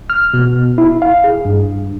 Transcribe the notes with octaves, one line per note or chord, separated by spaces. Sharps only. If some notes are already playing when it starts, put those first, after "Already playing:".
F6
B2
E4
F5
G#4
G2